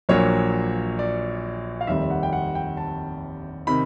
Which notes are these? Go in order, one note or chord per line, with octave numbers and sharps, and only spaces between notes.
A#1 A#2 F#3 A#3 C#5
D5
F5
F1 D#2 D#3 G3 C4 E5
F#5
G5
F#5
G5
A5
C3 D#3 B5